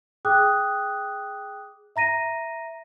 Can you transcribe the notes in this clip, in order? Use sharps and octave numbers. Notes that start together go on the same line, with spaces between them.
G#4 G5 D6 D#6 F#6
E5 A#5 A#6 D#7